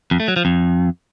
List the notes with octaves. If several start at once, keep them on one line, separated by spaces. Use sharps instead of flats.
F2
A3
F#3
F3
F2